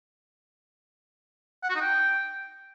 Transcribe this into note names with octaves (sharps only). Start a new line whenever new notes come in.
F#5
F#4
D#4
G5